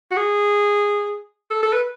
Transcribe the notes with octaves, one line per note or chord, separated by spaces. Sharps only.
F#4
G#4
A4
A4
B4